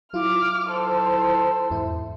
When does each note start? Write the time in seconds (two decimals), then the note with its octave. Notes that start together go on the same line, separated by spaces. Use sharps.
0.13 F#3 E4 F4 D6 F6
0.69 A4 C5
1.70 E2 G#2 E4